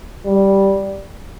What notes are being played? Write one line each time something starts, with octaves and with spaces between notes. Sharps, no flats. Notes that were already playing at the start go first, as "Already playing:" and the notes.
G3